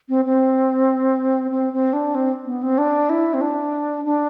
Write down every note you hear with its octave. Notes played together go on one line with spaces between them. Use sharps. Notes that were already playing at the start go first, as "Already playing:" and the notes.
C4
C4
C4
C4
D4
C4
B3
C4
D4
E4
C4
D4
D4